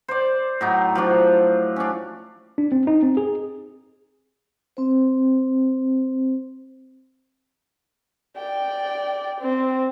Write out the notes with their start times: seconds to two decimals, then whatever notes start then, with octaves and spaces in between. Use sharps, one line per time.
0.08 C5 D5
0.61 A2 F#3 D#4
0.95 F3 F#3 D4
1.76 C#4 D4
2.58 D4
2.72 C4
2.87 D#4
3.03 C4
3.17 G#4
4.77 C4 C5
8.37 D5 G5
9.41 C4